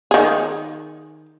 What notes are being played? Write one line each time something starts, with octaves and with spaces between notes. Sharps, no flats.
D#3 G#4